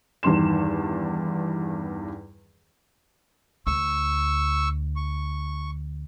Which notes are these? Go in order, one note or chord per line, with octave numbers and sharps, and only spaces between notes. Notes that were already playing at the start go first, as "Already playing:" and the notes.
E2 G2 D#3 C6 E7
D2 C#6 E6
C#6